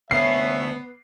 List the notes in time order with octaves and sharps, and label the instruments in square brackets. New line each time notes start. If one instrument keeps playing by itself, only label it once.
[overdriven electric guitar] D2 C#4 [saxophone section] B3 [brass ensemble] C#5 E5 [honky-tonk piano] C7